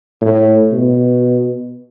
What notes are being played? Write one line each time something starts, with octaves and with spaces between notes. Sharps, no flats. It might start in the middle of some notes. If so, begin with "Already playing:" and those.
A2
B2